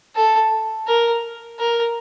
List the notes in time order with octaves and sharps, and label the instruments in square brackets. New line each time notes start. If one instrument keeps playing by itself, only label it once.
[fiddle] A4
A#4
A#4